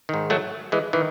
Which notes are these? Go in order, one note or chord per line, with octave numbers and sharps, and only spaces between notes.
G#2 D#3
F#3 A3
E3 G#3
D#3 E3